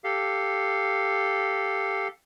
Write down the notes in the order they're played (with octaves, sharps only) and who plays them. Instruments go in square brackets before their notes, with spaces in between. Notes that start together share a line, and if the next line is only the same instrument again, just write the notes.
[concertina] G4 A4 F5